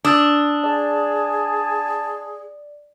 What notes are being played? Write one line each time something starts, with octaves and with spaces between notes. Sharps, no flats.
D4 D#6 E6 A6
G#4 D5 A5